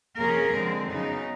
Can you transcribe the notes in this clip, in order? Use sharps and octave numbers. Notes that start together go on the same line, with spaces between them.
C3 F3 A#3 C#4 G#4 A#4
D3 F3 G#3 C4
C#3 F#3 B3 D#4